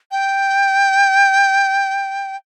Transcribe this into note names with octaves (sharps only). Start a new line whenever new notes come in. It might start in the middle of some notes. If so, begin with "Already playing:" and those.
G5